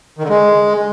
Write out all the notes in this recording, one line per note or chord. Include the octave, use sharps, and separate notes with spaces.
D#3
D3
G#3